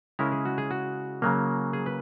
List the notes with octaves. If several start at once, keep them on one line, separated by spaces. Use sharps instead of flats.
C#3 G#3 C#4 E4 A#4
G#4
F#4
G#4
F#4
C#3 F#3 A#3
G#4
B4